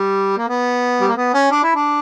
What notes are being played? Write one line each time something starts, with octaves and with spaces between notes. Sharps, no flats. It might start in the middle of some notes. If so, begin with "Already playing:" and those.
Already playing: G3
A#3
B3
G3
A#3
B3
C#4
D4
E4
D4